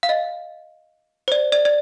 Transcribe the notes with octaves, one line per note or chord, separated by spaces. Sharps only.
F5
D#5
C5
D5
D5
D5